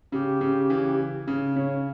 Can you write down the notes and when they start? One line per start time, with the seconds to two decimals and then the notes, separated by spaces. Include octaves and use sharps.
0.12 C#3 G4
0.41 C#3
0.70 C#3 E3
1.28 C#3
1.56 C#3 C#5